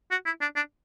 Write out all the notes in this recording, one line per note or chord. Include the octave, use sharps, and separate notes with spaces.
F#4
E4
D4
D4